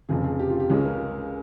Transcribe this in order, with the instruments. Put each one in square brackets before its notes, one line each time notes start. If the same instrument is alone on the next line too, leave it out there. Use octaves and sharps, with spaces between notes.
[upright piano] F1 F2 C#3 G#4
G#4
G4
F4
G4
C#2 C#3 G#3 C#4 G#4
A#4